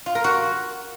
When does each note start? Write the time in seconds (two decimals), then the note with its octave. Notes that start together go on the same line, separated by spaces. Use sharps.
0.06 F4
0.15 A#4
0.24 F#4